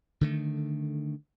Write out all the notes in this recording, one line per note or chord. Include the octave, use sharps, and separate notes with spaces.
D3 D#3 A3